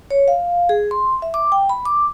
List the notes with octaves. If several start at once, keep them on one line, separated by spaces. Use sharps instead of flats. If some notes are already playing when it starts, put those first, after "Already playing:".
C#5
F5
G#4
C6
E5
D6
G5
B5
D6